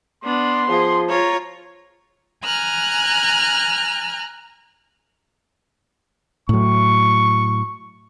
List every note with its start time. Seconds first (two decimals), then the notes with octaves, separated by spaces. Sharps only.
0.24 B3 D4 C6
0.69 F3 G#4
1.09 F4 C#5 A#5
2.45 G#5 A#5 F6 F#6
6.49 A2 F#3 C#6